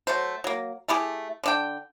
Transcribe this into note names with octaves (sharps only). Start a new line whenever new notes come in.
F#3 A3 C5
F#3 A#3
A3 E4 G4 G#4
D3 D4 G5